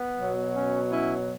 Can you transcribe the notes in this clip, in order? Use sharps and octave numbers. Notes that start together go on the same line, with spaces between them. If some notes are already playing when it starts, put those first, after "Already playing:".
Already playing: B3
B2 F#3
C#4
C#4 E4